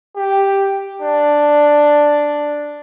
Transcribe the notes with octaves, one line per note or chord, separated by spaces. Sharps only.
G4
D4